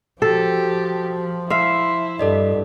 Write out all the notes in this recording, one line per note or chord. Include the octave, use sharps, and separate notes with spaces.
F3 F#4 G4 A4
E4 E5 F5 C6 C7
G2 A4 D5 D#5